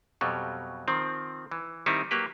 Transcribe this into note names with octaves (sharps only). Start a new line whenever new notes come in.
F2 B2 F#3 G3
D#3 F3 C4
E3
D#3 G3 C4 D#4 E4
F#3 A#3 G4 B4